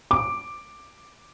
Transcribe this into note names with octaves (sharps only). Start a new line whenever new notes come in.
D6